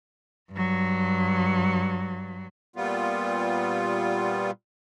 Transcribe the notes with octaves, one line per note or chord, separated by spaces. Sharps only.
G2 F#3
A#2 G3 B3 F4